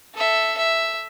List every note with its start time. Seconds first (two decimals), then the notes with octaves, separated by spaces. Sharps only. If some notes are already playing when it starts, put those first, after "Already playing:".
0.15 A4 E5
0.57 E5